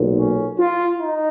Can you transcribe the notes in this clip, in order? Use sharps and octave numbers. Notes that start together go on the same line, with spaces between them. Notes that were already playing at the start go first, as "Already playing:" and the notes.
Already playing: B1 A#2
C#4
F4
D#4